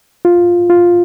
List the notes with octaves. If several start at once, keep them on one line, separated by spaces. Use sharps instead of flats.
F4
F4